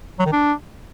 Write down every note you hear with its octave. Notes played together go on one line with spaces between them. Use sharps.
F#3
D#3
D4